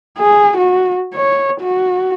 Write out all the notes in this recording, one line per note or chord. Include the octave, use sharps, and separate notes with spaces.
G#4
F#4
C#5
F#4